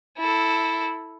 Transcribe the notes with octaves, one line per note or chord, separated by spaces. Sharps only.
E4 A4